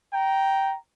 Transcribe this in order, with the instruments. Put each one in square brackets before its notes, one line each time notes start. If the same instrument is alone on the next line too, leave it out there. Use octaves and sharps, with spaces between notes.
[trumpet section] G5 A#5